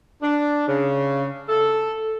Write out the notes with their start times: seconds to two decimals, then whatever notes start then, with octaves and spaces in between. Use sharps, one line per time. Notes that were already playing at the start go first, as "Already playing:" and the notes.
0.23 D4
0.68 C#3
1.49 A4